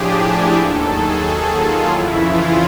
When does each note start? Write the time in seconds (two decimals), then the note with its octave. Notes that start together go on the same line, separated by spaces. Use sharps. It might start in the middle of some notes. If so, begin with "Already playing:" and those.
Already playing: A2 F3 D4 G4 G#4
0.23 E4
0.56 D#2 D#3 F#3 A4
0.89 G#4
1.23 G#4
1.56 F4
1.89 F2 C#3 E3 E4
2.22 F4